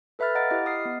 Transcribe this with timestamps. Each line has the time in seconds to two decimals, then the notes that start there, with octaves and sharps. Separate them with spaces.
0.19 A4 B4 E5 B5 F6 A6
0.35 D#5 F5 F#5 A#5 A6 D7
0.51 E4 G4 D#5
0.66 D#5 D#6 F6 C7
0.85 B3